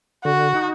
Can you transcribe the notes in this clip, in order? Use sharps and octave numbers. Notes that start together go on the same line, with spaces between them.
D3 F#4
D#4